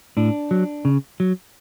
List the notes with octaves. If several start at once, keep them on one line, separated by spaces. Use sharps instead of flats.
A2 D4
F#3
C#3
F#3